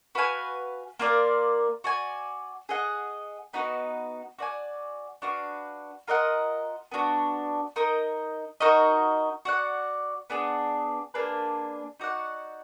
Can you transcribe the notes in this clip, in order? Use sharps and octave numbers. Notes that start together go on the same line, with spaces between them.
F#4 B4 F5 G#5
A#3 F4 A#4 D5
F#4 D5 G#5
G#4 D#5 F#5
B3 D#4 F#4 B4
F#4 D5 G#5
D4 F#4 B4 F5
F4 A#4 D#5 F#5
B3 D4 F#4
D#4 A#4 D#5
D#4 F#4 A#4 D#5
F#4 D5 F#5
B3 D4 G#4 D5
A#3 D4 G#4 B4
D#4 F#4 D5 F#5